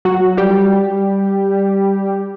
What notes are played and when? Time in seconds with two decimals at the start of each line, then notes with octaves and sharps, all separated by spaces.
0.05 F#3 F#4
0.37 G3 G4